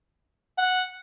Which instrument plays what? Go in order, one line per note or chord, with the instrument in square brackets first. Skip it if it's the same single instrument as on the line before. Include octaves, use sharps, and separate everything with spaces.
[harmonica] F#5